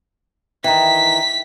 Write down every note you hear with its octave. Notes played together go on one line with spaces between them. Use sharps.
D#3 E3 G5 A#5 B6